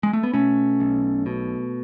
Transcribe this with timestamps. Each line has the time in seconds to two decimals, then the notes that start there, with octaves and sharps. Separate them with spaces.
0.03 G#3
0.13 A3
0.23 B3
0.33 B2 A3 C#4
0.80 B1
1.26 B2